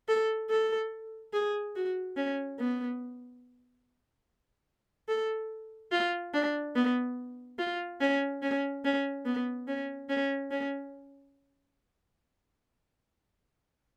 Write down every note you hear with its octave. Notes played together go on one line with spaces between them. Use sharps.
A4
A4
G#4
F#4
C#4
B3
A4
F4
D4
B3
F4
C#4
C#4
C#4
B3
C#4
C#4
C#4